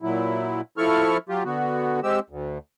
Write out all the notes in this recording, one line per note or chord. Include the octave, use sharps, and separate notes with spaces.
A#2 F#3 E4
F3 E4 A4 C#6 F6
F#3 F4 G4
D3 B3 F#4
G#3 C4 G4 E6
D2